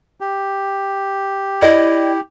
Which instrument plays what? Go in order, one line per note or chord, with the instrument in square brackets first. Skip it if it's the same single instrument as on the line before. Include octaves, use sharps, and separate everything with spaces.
[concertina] G4
[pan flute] E4 [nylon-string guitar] D5 D#5 G5